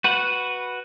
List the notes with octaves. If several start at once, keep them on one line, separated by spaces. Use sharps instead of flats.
F#4 B4 F#5